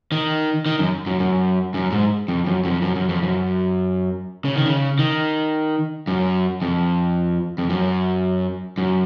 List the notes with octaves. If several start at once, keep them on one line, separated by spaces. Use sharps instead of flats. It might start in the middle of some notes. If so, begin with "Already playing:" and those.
D#3
D#3
F#2
F#2
F#2
F#2
G#2
F2
F#2
F2
F#2
F#2
F2
F#2
C#3
D#3
C#3
D#3
F#2
F2
F2
F#2
F#2